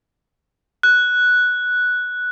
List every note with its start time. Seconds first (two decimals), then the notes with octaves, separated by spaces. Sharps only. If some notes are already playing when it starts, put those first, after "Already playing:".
0.83 F#6